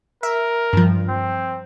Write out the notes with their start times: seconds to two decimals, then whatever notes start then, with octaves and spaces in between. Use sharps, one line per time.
0.23 A#4 E5
0.73 G2 F3
1.08 C4